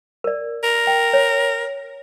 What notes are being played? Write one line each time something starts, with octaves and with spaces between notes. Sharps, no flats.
A#4 D5
A#4
G5
C#5